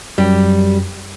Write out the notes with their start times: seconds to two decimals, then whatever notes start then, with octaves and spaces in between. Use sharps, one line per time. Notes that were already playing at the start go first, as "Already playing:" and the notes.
0.18 F#2 G3 G4